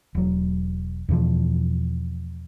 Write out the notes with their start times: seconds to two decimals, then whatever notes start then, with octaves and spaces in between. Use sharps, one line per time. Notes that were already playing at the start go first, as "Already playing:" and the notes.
0.15 E1 F#3
1.09 E2 B2 E3 F3